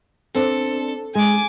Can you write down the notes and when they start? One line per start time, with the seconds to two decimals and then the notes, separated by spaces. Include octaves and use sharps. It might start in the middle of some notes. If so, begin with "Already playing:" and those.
0.35 C4 D4 A4
1.15 G#3 G#5 D6